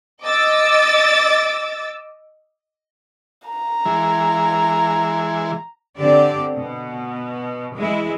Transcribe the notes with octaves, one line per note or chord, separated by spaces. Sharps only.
D#5 D6 E6 A6
A#5
E3 G#3
D3 C4 G4 D5
B2
E3 G#3 E4